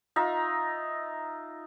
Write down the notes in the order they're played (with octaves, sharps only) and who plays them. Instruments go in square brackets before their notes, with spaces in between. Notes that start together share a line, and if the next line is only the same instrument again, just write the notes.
[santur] D#4 F4 E5 A#5